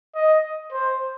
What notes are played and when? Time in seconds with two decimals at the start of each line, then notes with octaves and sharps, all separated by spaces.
0.15 D#5
0.72 C5